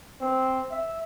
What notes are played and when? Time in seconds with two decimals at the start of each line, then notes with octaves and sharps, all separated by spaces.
0.21 C4
0.71 E5